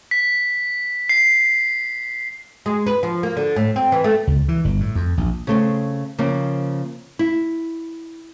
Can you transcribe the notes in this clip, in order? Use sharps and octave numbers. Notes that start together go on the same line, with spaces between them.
B6
C7
G#3
B4
F3
A#3
D3
A2
C4
E3
A3
C#2
E3
G1
A2
F2
A#1
C#3 A3 C4
C#3 F3 A#3 C4
E4